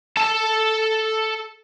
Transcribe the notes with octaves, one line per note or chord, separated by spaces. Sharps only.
A4 A5